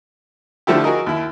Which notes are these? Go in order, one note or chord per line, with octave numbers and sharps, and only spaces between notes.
D3 F3 A3 E4 G4
F#4 G#4 A#4 D#5
D#2 E4